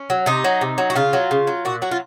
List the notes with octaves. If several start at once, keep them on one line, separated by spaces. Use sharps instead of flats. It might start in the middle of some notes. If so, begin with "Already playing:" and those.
Already playing: C#4
F#3
C3 D#4
F#3
C3
F#3
F#4
C#3 F4
F#3
C#3
F#3
A#2 F#4
F#3 F#4
F4